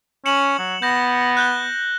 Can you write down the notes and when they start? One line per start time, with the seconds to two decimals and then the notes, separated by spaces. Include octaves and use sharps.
0.26 C#4 C#7 E7 F#7
0.59 F#3
0.82 B3 G6 A#6
1.37 F#6 G6 G7